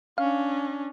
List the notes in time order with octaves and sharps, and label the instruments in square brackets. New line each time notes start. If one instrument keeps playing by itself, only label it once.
[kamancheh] C#4 D4 [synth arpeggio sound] F5